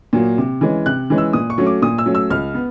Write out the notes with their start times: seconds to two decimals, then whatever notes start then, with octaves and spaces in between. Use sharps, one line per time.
0.13 A#2 F#3 A#3
0.38 C3
0.61 E3 G#3 C#4
0.86 C3 F#6
1.10 E3 G#3 C#4
1.18 E6
1.33 A#2 D#6
1.50 C#6
1.58 F#3 A3 C#4
1.67 D6
1.82 A#2 D#6
1.98 E6
2.06 F#3 A3 C#4
2.15 E6
2.30 C#2 F6
2.54 B3